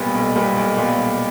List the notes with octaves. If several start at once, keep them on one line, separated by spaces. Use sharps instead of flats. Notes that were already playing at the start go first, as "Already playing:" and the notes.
Already playing: B1 A#2 G3 B3
B1
A#2 G3 B3
B1
A#2 G3 B3
B1